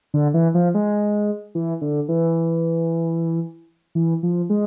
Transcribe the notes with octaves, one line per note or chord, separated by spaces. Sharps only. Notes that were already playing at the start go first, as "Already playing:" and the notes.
D3
E3
F3
G#3
E3
D3
E3
E3
F3
G#3